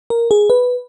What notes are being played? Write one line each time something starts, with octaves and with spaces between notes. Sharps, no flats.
A#4
G#4
B4